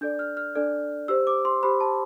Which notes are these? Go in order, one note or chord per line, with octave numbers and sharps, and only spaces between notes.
D4 A4 D5 G6
F6
F6
D4 A4 D5
G4 C5 E6
D6
C6
G4 C5 B5
A5